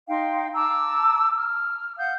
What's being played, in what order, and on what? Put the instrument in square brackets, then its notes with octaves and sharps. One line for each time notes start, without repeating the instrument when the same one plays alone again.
[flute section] D#4 F5 G5 C6
A5 A#5 D6 E6
F6
F5 F#5 D#6 G6